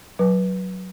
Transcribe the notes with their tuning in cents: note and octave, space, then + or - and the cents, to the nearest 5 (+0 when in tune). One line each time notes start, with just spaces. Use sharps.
F#3 +0 B4 -20